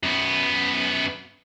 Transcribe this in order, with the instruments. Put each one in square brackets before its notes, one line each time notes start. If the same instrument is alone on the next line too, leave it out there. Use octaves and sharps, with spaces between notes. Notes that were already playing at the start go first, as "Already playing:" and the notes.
[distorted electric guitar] F#2 B3